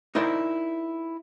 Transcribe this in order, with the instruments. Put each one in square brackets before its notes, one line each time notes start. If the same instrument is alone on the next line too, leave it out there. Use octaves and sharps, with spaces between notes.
[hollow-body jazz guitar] D#4 E4 A#4 C5 D5